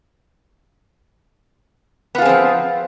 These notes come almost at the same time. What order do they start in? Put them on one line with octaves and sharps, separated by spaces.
B3 F4 G#4 C4 F3